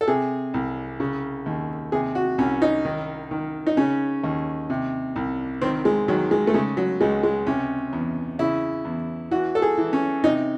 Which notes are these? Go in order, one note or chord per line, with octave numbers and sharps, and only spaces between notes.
A4
C3 G#4
C2
C#3
D#2
C3 G#4
F#4
C2 C#4
D#4
D#3
D#3
D#4
C#3 C#4
D#2
C3
C2
D#3 C4
G#3
D#3 F#3
G#3
A3
C#3 G#3
F#3
C#2 G#3
G#3
C3 C#4
E2
C#3 E4
E2
E3 F#4
A4
G#4
E3
C#4
C3 D#4